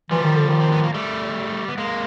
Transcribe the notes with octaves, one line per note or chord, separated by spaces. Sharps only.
E3 F3 G3
D#3
D3
D#3
C4
B3
A#3
G3 A3
B3
G#3 A#3